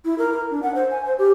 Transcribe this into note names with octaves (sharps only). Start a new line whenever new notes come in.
E4
A#4
A#4
D4
F#5
C5
G#5
C5
G4